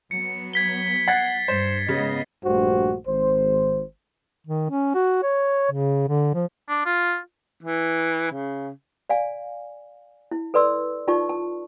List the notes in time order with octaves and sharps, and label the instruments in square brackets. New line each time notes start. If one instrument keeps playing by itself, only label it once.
[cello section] F#3 B3 [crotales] C#7
[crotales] G#6 B6 G7
[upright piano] F#5 [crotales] G#6 A6 C7
[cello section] G2 [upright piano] C5
[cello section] G#2 B3 D#5 [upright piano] C#3
[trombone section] A#1 G2 A3 F#4 G4 C5
G#1 C5
[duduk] D#3
C#4
F#4
C#5
C#3
D3
F3
[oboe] D4
F4
[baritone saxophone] E3
C#3
[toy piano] D5 F5 G#5
E4
A4 B4 D5 C6 E6
D#4 F4 D5 A5 C#6
A5